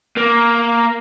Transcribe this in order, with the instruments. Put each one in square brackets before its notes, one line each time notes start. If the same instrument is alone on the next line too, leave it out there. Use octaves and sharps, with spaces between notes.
[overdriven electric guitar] A#3